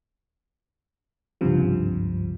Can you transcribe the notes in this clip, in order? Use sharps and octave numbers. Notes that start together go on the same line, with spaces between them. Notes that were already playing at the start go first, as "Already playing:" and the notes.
G#1 C#2 G2 C3 F3